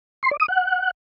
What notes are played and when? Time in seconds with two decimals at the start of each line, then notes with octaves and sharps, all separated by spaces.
0.23 C6
0.31 D5
0.40 D#6
0.48 F#5